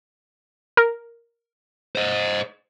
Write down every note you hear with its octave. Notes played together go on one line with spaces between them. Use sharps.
A#4
C5 D#5